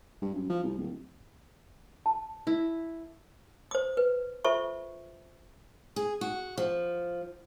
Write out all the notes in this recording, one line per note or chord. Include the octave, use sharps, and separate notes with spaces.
G2
F#2
F3
C2
D1
A5
E4
C5 D#6
B4
F4 A4 C5 E5 C#6
G#4
F#4
F3